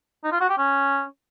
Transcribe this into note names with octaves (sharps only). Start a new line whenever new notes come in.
D#4
F4
F#4
G4
C#4